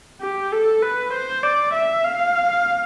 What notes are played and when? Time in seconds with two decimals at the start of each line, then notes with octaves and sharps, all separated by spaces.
0.21 G4
0.52 A4
0.82 B4
1.13 C5
1.43 D5
1.73 E5
2.04 F5